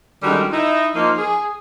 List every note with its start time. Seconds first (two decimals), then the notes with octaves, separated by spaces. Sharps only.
0.23 D3 D#3 G3 G#3 C#4 F#4
0.52 D#4 E4
0.95 F3 A#3 D#4
1.18 G#4